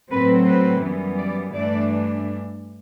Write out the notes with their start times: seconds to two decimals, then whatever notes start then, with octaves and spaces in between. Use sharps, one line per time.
0.10 A2 F#3 C4 B4
0.46 B4
0.81 F#2 E3 G3 B3
1.17 D5
1.53 G2 E3 A3 D4 D5